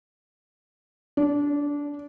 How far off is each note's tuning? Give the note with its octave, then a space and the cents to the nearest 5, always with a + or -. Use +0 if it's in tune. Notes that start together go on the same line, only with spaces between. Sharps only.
D4 -20